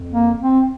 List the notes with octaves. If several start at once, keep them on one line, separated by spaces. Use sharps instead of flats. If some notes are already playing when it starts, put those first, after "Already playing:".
Already playing: F2
A#3
C4